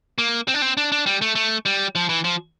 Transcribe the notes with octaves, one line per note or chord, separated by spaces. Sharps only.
A#3
C4
D4
C4
D4
D4
G3
A3
A3
G3
F3
E3
F3